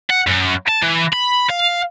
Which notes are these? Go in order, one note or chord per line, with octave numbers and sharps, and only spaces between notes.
F#5
F#2
A5
E3
B5
F5